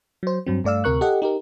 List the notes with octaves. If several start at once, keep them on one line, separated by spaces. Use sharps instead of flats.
F#3 C5
G2 F#3 C4
G2 A3 D5 F5 E6
D2 C3 A#4 C#6 F#6
G4 A4 D#5 F#5
D#4 G4 A#4